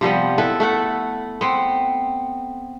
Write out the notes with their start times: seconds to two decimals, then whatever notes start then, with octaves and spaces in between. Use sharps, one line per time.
0.01 C3 F3 G3 B3
0.38 E4 A4 B4
0.60 A3 A4 F#5
1.41 B3 C4